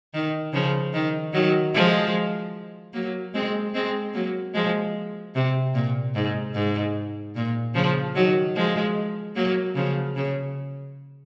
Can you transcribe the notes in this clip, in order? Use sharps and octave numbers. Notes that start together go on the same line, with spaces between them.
D#3
C#3 F3
D#3
D#3 F#3
F3 G#3
F#3 A#3
G#3 C4
G#3 C4
F#3 A#3
F3 G#3
C3
A#2
G#2
G#2
A#2
C#3 F3
D#3 F#3
F3 G#3
F#3 A#3
C#3 F3
C#3